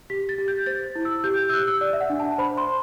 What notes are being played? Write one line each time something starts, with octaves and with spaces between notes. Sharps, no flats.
G4 B6
A6
G4
G6
C5 A6
E4
E6
G4 G6
G6
E6
G4 F#6
E6
D5
E5
F#5
D4
A5
C5 B5
C6